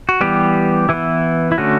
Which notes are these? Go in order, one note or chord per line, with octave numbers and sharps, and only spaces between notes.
F#4
E3 G3 B3 G4
E3 B3 E4
E4
D3 A3 C#4 F#4